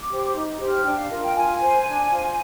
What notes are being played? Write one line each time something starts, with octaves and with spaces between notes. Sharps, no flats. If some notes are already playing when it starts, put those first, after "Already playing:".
Already playing: D6
G4 C5
D#4
G4 C5
F6
D4 G5
F5
F4 A#4 D#5
G5
F4 G#5
C5
D4
F4 C5